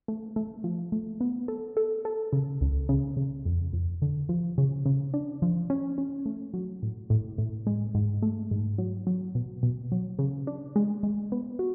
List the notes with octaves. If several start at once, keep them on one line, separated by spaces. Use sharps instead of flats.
A3
A3
F3
A3
B3
A4
A4
A4
C#3
C#2
C#3
C#3
F2
F2
D3
F3
C#3
C#3
D4
F3
C#4
C#4
A3
F#3
A2
A2
A2
G#3
G#2
A3
G#2
F#3
F#3
B2
B2
F#3
C#3
D4
G#3
G#3
B3
F#4